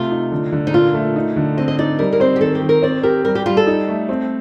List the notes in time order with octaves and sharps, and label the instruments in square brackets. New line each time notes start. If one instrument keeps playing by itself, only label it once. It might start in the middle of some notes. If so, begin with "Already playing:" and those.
Already playing: [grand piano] C3 A3 [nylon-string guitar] F4
[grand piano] D#4
D3
D3
[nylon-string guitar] D#4
[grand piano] A#2 [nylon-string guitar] F4
[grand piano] A3
D#4
D3
[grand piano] C4 [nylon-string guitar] D#5
[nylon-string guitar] D#5
[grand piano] D#4 [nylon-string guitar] D5
[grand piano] G3 [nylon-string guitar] A#4
[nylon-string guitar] A#4
[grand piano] C4 [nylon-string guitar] C5
[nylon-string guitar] G4
[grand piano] D#3 [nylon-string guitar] A4
[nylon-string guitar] G4
[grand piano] D#3
[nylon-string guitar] A#4
[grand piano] C4 [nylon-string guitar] D5
[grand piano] G4 [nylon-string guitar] A#4
[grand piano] G3 [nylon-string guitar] A#4
[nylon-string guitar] G4
[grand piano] G3 [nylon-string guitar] F4
[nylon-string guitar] A4
[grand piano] D#4
A3
C4